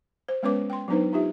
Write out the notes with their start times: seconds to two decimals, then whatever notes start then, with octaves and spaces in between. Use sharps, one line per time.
0.28 C5
0.43 G#3 B3 C#4 B4 C#5 D6
0.70 G5 C6
0.88 F#3 B3 D4 D#4 B4 C5
1.13 D#4 F4 G4 E5